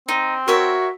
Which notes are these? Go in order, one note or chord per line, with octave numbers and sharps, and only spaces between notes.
C4 D#4
F#4 A#4 C#5 E5